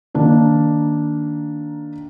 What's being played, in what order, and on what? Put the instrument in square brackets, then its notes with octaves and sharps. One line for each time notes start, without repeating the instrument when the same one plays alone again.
[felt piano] D#3 A#3 D4 D#4